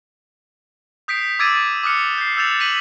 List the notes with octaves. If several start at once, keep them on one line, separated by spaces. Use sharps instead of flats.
D#6 G6 B6 C7 D7
D6 E6 G#6 A6 D7 D#7
D6 D#6 F6 F#6 C#7
G6 C7
E6 F#6 G6 A6 E7 F7
B6 D#7 F7 F#7